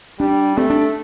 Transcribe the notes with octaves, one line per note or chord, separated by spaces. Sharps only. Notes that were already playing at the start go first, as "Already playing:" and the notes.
G3 D4
A3 C4
D4